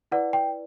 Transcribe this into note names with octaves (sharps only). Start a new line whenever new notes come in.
E4 B4 D5 F#5
G5